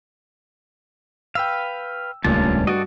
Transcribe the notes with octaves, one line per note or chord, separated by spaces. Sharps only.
B4 F5 G5 E6
D#1 C#2 G2 A#2 A3 C#4 A5
F#4 A4 D5 D#5